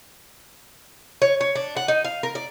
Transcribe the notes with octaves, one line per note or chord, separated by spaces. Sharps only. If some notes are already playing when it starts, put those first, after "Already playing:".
C#5
C#5
D4
F#5
D#4
F5
A#4
D5